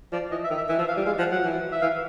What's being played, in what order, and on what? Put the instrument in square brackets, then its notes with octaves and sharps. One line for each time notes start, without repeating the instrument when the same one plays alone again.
[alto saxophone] F3 [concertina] D5
[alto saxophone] E3 [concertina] D#5
[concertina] E5
[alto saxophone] D#3
[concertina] E5
[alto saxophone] E3 [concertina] E5
[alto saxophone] F3
[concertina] F5
[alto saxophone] G3
[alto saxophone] G#3 [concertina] F5
[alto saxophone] F3 [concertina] F#5
[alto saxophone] F#3 [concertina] F#5
[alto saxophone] E3
[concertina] E5
[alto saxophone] E3 [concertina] F5